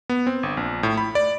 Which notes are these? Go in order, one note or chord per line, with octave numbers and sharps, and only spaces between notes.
B3
C4
G1
A#1
A2
B5
D5